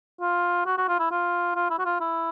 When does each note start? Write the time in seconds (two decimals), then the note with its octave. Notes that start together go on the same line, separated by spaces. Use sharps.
0.21 F4
0.66 F#4
0.78 F#4
0.88 F4
0.99 E4
1.11 F4
1.55 F4
1.70 E4
1.79 F#4
1.85 F4
2.00 E4